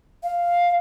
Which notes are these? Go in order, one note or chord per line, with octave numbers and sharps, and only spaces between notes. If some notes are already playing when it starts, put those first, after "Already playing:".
F5